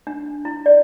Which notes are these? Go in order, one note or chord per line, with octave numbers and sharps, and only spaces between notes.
D4
E4
D5